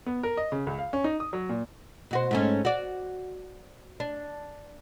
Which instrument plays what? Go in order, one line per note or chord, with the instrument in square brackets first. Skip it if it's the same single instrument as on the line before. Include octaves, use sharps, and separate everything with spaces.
[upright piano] B3
A#4
D#5
C#3
C#2
F5
C#4
D#4
D#6
F#3
A#2
[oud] B2 F#4 C5
G#2 A3 C#4
F#4 D5
D4